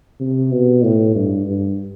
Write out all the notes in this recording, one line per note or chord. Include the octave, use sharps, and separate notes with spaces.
C3
B2
A2
G2
G2